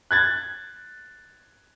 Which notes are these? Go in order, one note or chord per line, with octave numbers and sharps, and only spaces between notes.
F#6 G#6 A6